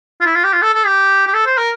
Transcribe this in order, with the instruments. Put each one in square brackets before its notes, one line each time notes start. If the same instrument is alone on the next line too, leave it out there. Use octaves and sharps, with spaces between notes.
[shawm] F4
E4
F4
G4
F4
A4
A4
G4
G4
A4
C5
A#4